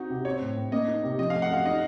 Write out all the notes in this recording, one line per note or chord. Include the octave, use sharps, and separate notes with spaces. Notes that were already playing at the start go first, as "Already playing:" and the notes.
Already playing: C4 D#4 F#4
C3
C4 C#5
A2
A2
A#3 D#5
D#4
C3
F3 D#5
A3 F5
F#5
F#2 F5
D#4 D#5